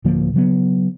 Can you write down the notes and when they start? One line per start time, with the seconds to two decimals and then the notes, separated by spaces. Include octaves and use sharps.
0.05 D1 D3 F3 A#3
0.34 C#3 F#3 B3